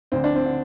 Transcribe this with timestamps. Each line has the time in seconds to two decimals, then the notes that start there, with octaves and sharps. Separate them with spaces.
0.12 D2 D3 C4
0.24 D4
0.36 C4
0.46 D3